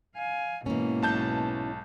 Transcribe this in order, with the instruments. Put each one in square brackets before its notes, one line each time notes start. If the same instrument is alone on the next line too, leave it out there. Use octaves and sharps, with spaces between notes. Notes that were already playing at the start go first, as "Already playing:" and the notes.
[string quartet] F5 G#5
[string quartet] G#2 B2 [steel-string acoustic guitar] E3 C#4 [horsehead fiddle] A#3
[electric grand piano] B1 A5 G6